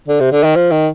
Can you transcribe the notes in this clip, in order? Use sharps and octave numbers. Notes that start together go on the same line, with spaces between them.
D3
C3
D3
D#3
F3
D#3